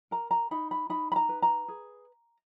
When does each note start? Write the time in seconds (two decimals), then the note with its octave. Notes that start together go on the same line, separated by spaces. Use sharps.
0.11 A#4 A#5
0.31 A#5
0.51 D#4 B5
0.71 B5
0.89 D#4 B5
1.12 B5
1.16 A#5
1.29 B4
1.42 A#5
1.68 G#4